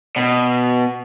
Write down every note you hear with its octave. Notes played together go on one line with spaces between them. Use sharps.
B2